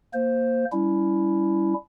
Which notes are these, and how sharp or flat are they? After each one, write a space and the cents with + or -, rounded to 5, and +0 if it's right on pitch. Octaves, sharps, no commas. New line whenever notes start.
A#3 +0 C5 +0
G3 +0 C#4 +35 E4 +0